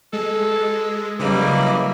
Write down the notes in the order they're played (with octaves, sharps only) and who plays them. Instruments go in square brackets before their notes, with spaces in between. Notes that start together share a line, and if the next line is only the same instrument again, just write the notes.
[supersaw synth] G#3 [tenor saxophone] A4
[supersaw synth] C#3 D#5 D6 [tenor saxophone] E3 [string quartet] F#3 A#3 E4 [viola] G3